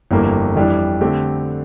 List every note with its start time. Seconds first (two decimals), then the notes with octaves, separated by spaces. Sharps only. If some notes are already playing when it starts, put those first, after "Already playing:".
0.11 G1 F2 E3 G3 A#3
0.55 F2 E3 G3 D4
1.01 D3 A3 C4 G4